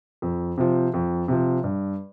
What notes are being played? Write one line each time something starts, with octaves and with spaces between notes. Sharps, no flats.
F2
C3 F3
F2
C3 F3
G2